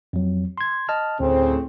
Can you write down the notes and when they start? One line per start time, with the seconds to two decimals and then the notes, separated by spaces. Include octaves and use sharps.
0.13 F2 F#3
0.58 C6 G#6
0.89 D#5 A5 F6
1.20 D2 A2 C#3 C4